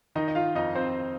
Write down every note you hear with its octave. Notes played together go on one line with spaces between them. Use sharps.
D#3 D#4 D#5
D#5
F4 F5
F2 D#4 D#5
C4 C5